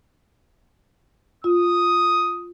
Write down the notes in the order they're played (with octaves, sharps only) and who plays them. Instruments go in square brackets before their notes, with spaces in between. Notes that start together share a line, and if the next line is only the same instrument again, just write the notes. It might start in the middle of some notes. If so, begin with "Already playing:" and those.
[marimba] F4 [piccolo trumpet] D#6